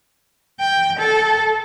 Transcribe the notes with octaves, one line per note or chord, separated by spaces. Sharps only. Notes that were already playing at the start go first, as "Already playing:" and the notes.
G5
A4